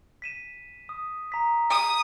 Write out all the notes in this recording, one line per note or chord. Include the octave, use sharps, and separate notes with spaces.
B6 D#7 E7
D#6
A#5 B6
D#6